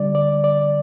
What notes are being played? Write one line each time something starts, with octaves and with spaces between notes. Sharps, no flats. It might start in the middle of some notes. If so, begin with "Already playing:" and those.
Already playing: D2 D3 G3 D5
D5
D5